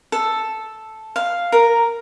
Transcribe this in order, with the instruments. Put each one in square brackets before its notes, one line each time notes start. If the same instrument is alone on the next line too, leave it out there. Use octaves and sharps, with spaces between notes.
[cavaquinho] A4
F5
A#4